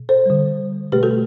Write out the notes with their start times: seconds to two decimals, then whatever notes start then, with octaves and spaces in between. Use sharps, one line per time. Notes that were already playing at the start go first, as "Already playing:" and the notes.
Already playing: B2
0.09 A4 C5
0.26 D3 G3
0.92 B2 A3 G4 B4
1.03 F#4 A4